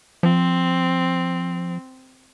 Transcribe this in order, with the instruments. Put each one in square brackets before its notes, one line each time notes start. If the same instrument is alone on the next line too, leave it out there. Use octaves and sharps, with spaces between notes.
[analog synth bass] F3 [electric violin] C4